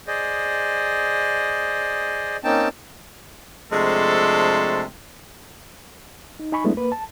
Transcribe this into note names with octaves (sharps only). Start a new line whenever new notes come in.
G#4 C5 D5 D#5
A#3 C4 C#4 D#4 G5 A5
C3 F3 G#3 A3 D4 A4
D#4
D#4 G#5 B5 C#6
F#3 G#3 A3 B3 D4 E4
A#3 B4
A5